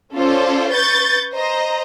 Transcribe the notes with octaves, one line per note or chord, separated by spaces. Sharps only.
C#4 F4 A4 C5 D5
B4 C#6 G6 A6
C5 D#5 A#5